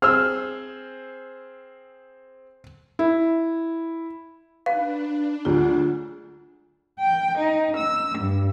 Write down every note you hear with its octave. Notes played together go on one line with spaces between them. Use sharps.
C4 G#4 C5 E6 F6
E4
D4 D#4 B4 F5
D2 F#3 G#3 F4
G5
D#4
E6
G2